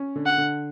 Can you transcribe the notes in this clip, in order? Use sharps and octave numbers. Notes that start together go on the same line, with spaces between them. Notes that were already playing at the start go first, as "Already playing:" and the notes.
Already playing: C#4
D3
F#5
D3